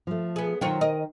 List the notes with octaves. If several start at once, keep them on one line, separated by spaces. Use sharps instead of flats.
F3 A3
B3 G#4
D#3 F#3 F4 C5 C#5 G5
A#4 D#5